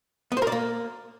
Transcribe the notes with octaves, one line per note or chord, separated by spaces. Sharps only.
B3
C5
A#4
D5
A#3